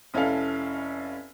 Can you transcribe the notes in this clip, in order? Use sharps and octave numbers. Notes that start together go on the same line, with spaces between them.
F1 C#4 E4 A4 F5